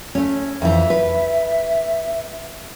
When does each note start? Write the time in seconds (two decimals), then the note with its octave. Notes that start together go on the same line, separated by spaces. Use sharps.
0.15 A3 C#4
0.62 F2 E3 E5
0.90 B4